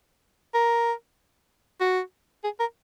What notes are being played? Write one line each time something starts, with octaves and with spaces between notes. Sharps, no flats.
A#4
F#4
G#4
A#4